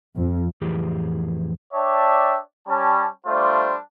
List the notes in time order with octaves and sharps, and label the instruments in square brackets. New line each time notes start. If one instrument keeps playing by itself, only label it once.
[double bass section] F2
[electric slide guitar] F2 A2 E3 G4 G#4
[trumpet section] D4 C#5 D5 E5 G5 A5
G3 C#4 A5
G3 A3 D4 F4 C5